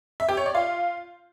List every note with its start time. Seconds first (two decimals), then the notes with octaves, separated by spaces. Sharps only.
0.20 E5
0.29 G4
0.37 C#5
0.46 D5
0.55 F4